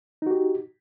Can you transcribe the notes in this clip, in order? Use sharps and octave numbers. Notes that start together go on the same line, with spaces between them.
D#4 F#4 G4